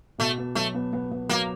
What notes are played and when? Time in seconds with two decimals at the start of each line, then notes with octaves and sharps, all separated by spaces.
0.18 B2 A3
0.38 B3
0.55 F#3 A3
0.75 B3
0.93 B3
1.12 B3
1.29 F#3 A#3